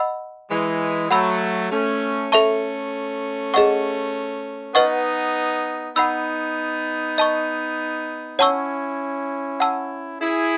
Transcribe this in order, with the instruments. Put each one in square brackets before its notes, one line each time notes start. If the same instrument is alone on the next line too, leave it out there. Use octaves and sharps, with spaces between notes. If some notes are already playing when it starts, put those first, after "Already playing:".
Already playing: [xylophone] D#5 F#5 B5 E6
[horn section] E3 G#3
[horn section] F#3 A3 [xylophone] F#5 B5 E6
[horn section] A3 C#4
[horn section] A3 C#4 [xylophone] A4 E5 A5 C#6
[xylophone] G#4 D#5 F#5 C#6
[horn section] B3 D#4 [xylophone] B4 D#5 F#5 C#6
[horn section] B3 D#4 [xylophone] F#5 B5 E6
[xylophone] D#5 A5 C#6
[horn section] C#4 E4 [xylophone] C#5 F#5 A5 C#6 E6
[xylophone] F#5 A5 E6
[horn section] E4 G#4